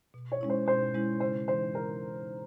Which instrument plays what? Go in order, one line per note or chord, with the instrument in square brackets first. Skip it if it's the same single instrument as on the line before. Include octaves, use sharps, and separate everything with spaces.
[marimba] B2
[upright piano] C#5
[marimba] G#3 C#4 E4
[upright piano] C5
[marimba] B2 [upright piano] C5
[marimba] G#3 C#4 E4
[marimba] C#3 [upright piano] C5
[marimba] E3 G#3 [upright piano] C5
[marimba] C#3 [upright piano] A#4